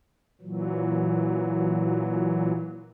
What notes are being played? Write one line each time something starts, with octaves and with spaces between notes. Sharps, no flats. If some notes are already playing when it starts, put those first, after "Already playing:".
A#2 E3 F#3